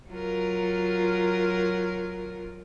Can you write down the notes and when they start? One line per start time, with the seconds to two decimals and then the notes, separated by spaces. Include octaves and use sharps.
0.10 F#3 F4 A#4